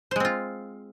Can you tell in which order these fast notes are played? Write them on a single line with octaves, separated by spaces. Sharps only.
C5 G#3 C4 F4